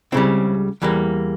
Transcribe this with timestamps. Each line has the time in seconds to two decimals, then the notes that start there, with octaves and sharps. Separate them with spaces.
0.12 C#2 C#3 G3 C4 E4
0.82 E2 E3 G3 A#3